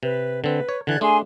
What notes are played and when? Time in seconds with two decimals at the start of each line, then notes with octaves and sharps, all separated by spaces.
0.03 C3 B4
0.44 D3 C4 B4
0.69 C#5
0.87 D3 E3 D5 F#6 G#6
1.01 A3 D4 G#4 G#5 C6